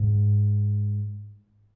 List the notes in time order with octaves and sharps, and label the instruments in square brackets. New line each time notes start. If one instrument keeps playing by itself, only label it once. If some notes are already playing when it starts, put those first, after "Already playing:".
Already playing: [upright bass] G#2